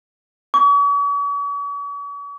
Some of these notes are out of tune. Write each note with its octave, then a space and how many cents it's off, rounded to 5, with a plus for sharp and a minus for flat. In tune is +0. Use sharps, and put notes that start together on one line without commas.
C#6 +45